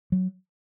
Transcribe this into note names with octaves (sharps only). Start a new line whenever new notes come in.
F#3